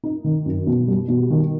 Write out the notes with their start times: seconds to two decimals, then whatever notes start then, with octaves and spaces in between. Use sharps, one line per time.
0.04 D#4
0.24 D#3
0.46 F#2
0.67 B2
0.88 G3
1.08 B2
1.30 D#3